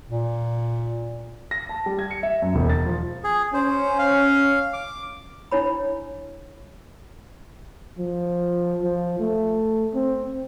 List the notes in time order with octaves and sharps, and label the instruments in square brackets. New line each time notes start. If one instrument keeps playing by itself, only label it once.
[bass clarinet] A#2
[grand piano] A#6
A5
G3
G#6
C#7
E5
F#2
E1
A6
F3
[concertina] G#4
[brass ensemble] C#4 [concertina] C5
[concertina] F5
D6
[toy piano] D4 E4 C#5 B5
[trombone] F3
F3
A3
C4